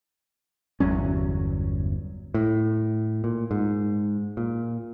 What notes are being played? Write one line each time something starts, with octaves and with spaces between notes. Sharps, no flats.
G1 E2 F#3 C#4
A2
A#2
G#2
A#2